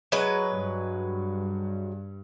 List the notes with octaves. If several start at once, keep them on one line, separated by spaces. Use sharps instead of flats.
F#3 G#3 B4
G2